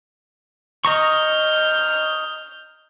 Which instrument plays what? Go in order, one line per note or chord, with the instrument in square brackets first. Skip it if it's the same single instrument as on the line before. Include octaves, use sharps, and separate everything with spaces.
[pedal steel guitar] D#5 A#5 C#6 [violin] F6 G6